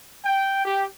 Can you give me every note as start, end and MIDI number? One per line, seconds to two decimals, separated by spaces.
0.24 0.65 79
0.65 0.84 67